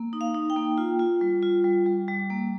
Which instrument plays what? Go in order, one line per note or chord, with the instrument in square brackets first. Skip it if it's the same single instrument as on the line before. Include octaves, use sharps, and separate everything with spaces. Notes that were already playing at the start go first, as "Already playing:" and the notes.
Already playing: [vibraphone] A#3
D#4
F5
D#4
G5
A#3
F4
F4
G3
F4
G3
G3
G3
A#3